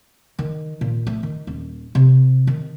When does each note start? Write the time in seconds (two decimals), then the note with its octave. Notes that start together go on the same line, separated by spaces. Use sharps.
0.39 D#3
0.81 A#2
1.07 A3
1.23 D#3
1.47 D#1
1.95 C3
2.47 D#3